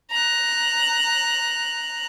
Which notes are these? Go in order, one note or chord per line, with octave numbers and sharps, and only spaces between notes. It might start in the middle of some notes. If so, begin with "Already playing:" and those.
A#5 F#6